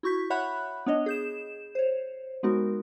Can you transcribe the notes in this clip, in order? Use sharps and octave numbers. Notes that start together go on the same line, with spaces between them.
E4 F#4 C#6 G6 B6
C#5 E5 F#5 B5 F#6 G6
B3 D4 C#5 D#5
G#4 G6 E7
C5 C#5
G#3 B3 D#4 F#4 A#4